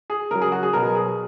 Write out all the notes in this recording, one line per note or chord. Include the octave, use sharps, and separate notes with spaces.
G#4
C#3 F#3 A#4
G#4
F#4
G#4
B2 F#3 A#4
G#4